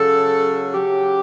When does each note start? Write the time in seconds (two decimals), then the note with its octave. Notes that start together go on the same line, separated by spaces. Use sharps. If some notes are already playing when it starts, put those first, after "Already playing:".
Already playing: C#3 F#3 A4
0.75 C#3 F#3 G4